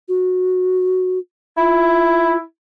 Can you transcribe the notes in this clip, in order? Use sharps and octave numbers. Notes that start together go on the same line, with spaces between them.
F#4
E4 F4